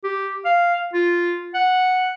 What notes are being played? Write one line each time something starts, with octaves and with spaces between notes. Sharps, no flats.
G4
F5
F4
F#5